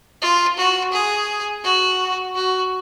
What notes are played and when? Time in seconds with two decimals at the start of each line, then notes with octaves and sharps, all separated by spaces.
0.22 F4
0.58 F#4
0.92 G#4
1.64 F#4
2.35 F#4